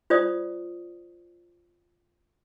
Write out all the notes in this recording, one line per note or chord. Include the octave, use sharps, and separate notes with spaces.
F4 C5 D5 D#6